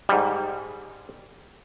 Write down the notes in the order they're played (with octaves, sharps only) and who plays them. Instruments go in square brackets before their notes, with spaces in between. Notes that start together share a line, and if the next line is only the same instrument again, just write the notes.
[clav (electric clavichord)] G#2 G3